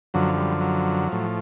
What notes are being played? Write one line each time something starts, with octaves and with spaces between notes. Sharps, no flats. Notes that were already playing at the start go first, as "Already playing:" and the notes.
F#2 D3 F3 F#3
G3
F#3
A2 F3